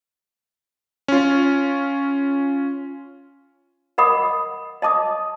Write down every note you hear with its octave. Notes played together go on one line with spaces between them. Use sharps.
C#4 F4
A#4 D#5 F#5 B5 D6 D#6
D#5 A5 D6 D#6